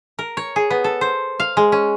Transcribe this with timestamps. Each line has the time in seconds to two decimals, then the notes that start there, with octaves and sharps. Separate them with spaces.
0.19 A#4
0.37 C#5
0.56 G#4
0.71 B3
0.84 A4
1.01 C5
1.40 F5
1.57 G#3
1.72 C#4